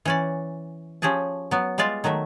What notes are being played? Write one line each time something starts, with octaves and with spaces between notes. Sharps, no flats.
E3 C#4 D5
F3 C#4 G4 G#4 A5
F#3 B3
G3 G#3 F4 D5 E5
D#3 F#3 A3 E5